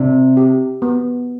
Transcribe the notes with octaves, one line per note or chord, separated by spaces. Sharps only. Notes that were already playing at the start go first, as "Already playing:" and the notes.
Already playing: C3 D4
G4
B3